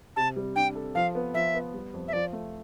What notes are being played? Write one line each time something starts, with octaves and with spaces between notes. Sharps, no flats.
C3 A5
G3
D4 G5
A4
F3 F5
B3
F3 E5
B3
G3
F2
E5
F3 D5
A3